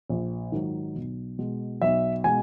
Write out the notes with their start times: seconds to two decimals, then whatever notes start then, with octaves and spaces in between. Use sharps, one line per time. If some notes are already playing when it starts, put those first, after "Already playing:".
0.10 A#1
0.52 G#2 D#3 F#3
0.95 B1
1.39 B2 G#3
1.81 B1 E5
2.24 B2 G#3 G#5